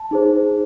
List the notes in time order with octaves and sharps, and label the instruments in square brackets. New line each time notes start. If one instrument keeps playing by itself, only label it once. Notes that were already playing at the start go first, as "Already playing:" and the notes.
Already playing: [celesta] A5
D#4 G#4 C5